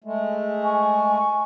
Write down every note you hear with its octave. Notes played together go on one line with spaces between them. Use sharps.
G#3 A3
G#5 C#6